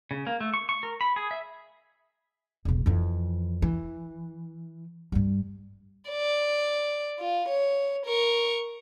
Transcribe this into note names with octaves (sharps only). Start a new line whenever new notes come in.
C#3
A#3
A3
C#6
C#6
A#4
B5
G#4
E5
E1 B1
F2 E3
E3
G2 G3
D5
F4
C#5
A#4 C#6